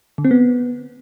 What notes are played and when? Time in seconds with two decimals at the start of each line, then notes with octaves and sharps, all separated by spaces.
0.18 D3
0.25 C4
0.31 B3